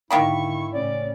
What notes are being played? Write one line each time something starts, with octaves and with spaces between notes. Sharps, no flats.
G#2 D3 D#3 A#3 E4 B5 C#6
A2 C#3 C#4 D5